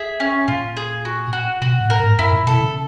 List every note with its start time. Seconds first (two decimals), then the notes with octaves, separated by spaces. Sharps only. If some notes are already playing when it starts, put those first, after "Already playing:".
Already playing: G#4 E5
0.20 C#4
0.48 A#2 F4
0.77 G#4
1.05 F#4
1.33 F#4
1.62 B2 F#4
1.81 A2
1.90 A#4
2.00 G#2
2.18 F#2 E4
2.33 A#2
2.47 B2 A4
2.61 C#3